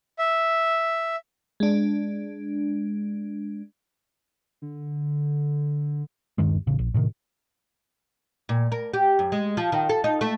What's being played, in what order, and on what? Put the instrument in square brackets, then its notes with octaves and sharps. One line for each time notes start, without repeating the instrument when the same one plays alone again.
[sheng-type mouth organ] E5
[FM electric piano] G#3 D4
[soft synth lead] D3
[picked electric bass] D#1 G2 D#3 G#3
A1 C#3
A#1
A2 C3 D#3
[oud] A#2
A#4
G4
F#2
G#3
F3
D#3
A4
D#4
A3